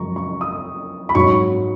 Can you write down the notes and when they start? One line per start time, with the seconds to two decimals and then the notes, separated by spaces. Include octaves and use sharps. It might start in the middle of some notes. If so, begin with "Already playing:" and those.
Already playing: F#2 C#3 F3 G#3 A#5 C#6
0.16 C#6
0.41 D#6
1.09 B5
1.15 G#2 F#3 C#6